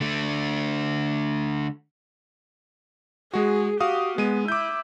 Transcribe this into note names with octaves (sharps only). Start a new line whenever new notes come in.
D3 A3
G#3 F#4 G#4
F#4 G4 F5 D#6
G#3 B3 D#7
E4 D6 G6